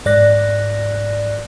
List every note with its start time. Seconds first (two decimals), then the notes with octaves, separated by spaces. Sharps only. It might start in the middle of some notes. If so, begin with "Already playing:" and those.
0.06 G#2 D5 F#6 A#6